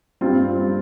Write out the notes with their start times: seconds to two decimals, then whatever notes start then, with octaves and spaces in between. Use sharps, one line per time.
0.21 G2 G3 C4 F4
0.56 G2 G3